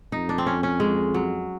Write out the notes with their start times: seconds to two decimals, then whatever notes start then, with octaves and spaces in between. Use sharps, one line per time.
0.12 F2 D#4
0.29 D4
0.38 C4
0.47 C#4
0.63 C#4
0.80 G#3
1.14 F#3